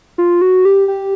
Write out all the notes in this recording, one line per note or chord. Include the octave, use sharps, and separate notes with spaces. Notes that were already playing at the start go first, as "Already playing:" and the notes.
F4
F#4
G4
G4